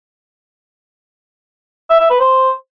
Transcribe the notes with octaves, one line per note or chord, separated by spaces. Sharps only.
E5
E5
B4
C5